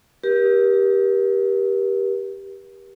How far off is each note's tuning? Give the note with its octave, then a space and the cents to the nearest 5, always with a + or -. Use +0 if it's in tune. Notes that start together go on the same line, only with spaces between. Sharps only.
G4 +0 A#4 +40